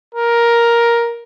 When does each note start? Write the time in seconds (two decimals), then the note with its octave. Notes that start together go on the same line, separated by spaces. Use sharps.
0.15 A#4